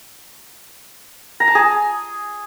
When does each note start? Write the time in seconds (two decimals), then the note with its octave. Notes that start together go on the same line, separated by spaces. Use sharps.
1.40 A#5
1.48 A5
1.55 G#4